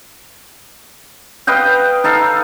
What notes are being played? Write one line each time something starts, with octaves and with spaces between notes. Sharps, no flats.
B4 D#5 F5 G5
D#4 A4 F5